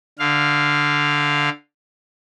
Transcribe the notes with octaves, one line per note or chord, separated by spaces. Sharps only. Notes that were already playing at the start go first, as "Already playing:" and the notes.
D3 F5